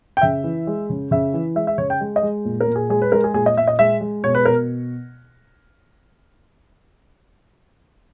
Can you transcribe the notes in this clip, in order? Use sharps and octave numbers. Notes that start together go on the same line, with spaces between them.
G5
C#3 E5
E3
G#3
C#3
C#3 E5
E3
G#3 E5
E5
C#3 C#5
G5
G#3
D#5
G#3
A#2
A#4
A#2
G#4
G#3 G#4
B4
G#3 A#4
G#4
A#2 G#4
D#5
A#2 E5
D#5
G#3 E5
G#3
B2 C#5
B4
B2 A#4